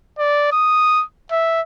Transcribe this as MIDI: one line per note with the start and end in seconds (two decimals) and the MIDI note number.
0.18 0.47 74
0.52 1.03 87
1.31 1.61 76